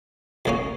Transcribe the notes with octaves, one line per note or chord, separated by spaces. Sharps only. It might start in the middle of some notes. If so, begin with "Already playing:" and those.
C#2 C#3 A#3 C#4